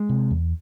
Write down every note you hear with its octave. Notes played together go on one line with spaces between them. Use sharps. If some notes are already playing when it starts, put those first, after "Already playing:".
Already playing: G#3
C3
E2